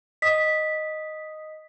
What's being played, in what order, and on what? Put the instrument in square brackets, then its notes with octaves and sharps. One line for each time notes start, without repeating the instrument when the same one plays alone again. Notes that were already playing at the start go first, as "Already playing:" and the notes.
[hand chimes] D#5 D#6 [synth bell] B6